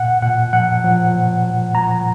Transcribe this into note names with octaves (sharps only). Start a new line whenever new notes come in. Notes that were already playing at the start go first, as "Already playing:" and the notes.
Already playing: A#2 F#5
A#2 F#5
F3 F#5
F3
A#2
F3
F3 A#5